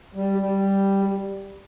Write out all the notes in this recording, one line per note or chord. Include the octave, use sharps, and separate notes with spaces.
G3
G3